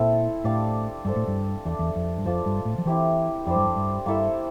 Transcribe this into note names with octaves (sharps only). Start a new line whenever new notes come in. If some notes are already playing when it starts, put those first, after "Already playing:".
Already playing: A#2 C4 E4 A4
A2 D4 G4 D5 F5
G2 D4 A4 C5
A2
G2
E2 A3 D4 A4
E2
F2
G2
F2 D4 F4 A4 C5
G2
A2
F3
E3 C4 E4 G4 C5
F2 G3 D4 G4 C5
G2
F2
G2
G2 A#3 E4 A4 E5